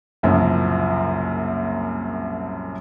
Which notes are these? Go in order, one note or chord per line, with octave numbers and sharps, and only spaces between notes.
C2 F#2 A#2 C#3 F3